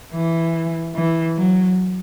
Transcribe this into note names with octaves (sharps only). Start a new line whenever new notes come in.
E3
E3
F#3